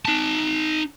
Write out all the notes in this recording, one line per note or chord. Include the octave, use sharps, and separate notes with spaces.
D#4 A5